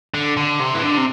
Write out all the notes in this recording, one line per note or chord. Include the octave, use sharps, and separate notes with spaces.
D3
D3
C3
E3
D3
C3